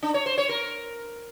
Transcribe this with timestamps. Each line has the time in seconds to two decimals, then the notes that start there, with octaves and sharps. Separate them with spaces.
0.03 D4
0.14 C#5
0.26 C5
0.38 C#5
0.49 A#4